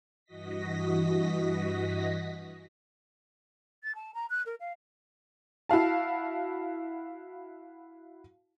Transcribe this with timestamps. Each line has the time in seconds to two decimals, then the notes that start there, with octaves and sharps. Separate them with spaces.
0.25 G2 E3 F#4 D#5 A#6 B6
3.83 A6
3.95 A5
4.14 A#5
4.30 F#6
4.46 A#4
4.60 F5
5.69 E4 F#4 F5 A5